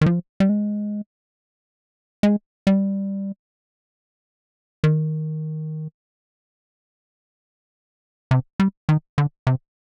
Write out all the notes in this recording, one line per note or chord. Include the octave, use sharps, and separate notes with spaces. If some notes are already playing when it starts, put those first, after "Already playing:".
D#3
F3
G3
G#3
G#3
G3
D#3
C3
G3
D#3
D3
C3